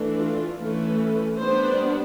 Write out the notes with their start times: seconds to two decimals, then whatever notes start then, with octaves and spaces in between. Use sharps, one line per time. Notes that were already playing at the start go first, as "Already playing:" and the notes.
Already playing: E3 A3 D4
0.20 F4
0.59 E3 A3 C#4 B4
1.38 G3 B3 D4 C5